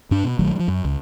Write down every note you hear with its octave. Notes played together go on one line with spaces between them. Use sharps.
G2 D4
B2
A#1 D#3 F#3 A3
F3 G3
F#2
C#2